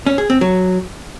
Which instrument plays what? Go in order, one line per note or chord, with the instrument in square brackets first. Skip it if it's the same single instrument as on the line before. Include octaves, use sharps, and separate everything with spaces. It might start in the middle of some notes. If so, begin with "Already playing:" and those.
[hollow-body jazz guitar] C#4
G#4
C4
F#3